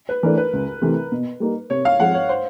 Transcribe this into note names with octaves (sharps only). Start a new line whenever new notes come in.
B4
E3 A3 D4 A#4
B4
C#2
C3 E3 A3
B2
G3 A#3 D#4
C3 C#5
F5
F3 G#3 C4 F#5
C#5
C5